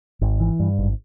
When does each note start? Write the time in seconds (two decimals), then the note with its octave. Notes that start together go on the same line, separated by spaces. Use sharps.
0.21 G#1
0.40 E3
0.60 G2
0.79 G#1